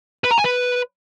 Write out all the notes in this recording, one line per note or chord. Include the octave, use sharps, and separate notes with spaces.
B4
A#5
G#5
B4